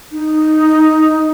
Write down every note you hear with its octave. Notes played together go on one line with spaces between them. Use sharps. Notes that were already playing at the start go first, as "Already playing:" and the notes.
D#4